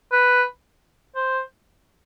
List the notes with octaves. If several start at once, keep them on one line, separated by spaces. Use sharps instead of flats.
B4
C5